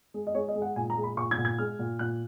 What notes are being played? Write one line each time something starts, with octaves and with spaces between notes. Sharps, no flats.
G#3
D#5
G#3 C#5
D#5
G#3
F#5
A#2 G#5
A#5
G#3
B5
A#2 C#6
G#6
A#2
G#6
G#3 F6
A#2
A#2 F#6